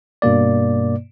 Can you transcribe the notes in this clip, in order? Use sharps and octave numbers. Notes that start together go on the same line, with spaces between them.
G2 B2 A#3 D5